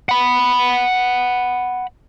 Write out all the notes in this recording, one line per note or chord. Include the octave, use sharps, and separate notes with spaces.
F#5 B5